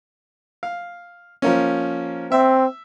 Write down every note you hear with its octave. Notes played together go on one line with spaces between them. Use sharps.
F5
F3 A#3 C#4
C4 E5